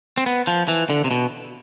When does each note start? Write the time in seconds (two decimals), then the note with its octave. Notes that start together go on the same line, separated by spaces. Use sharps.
0.17 C4
0.26 B3
0.47 F3
0.68 E3
0.90 D3
1.04 C3
1.11 B2